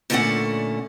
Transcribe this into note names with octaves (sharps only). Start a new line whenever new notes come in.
A#2 D3 F#3 A3 C#4 F#5